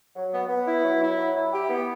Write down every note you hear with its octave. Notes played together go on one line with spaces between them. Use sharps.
F#3
B3
B3
E4
F#3
E4
F#3
E4
G4
B3